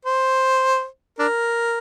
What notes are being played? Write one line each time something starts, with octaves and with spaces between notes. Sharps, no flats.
C5
D4 A#4